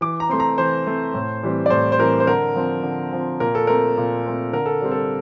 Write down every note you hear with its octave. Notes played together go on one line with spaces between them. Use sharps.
E3 D6
A#5
A3 C4 C6
A#5
E3 C5
A3 C4
A2
E3 G3 C4
D5
A2 C5
C5
E3 G3 C4 A#4
C5
D3 A#4
F3 C4
D3
F3 C4
A#2 A#4
A4
A3 C4 A#4
A#2
A3 C4
D3 A#4
A4
G3 C4
A4